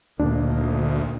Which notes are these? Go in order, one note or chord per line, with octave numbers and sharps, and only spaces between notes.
D2 A#2 D#3 D4